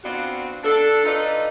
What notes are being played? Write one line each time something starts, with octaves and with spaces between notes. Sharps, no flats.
B3 C4 D4 F4 F#4
D4 A4
D#4 F4 A4 B4 D5 D#5